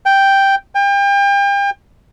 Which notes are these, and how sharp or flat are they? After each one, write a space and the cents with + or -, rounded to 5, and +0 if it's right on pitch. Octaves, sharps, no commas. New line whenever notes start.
G5 +0
G5 +35